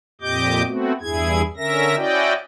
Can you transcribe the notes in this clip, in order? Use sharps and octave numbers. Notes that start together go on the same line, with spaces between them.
F2 A#2 G4 D#5 D6 G6
A3 B3 C4 F#4
E2 G2 E4 G#4 G#6
D3 C#4 A#4 E5 A#6
C#4 E4 F#4 D5 D#5 G5